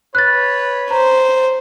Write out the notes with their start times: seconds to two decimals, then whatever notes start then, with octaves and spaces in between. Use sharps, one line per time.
0.15 B4 C#5 F#6 A6
0.91 C5 A#5